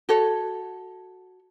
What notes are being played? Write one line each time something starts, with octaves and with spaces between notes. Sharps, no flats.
F#4 A4 C#5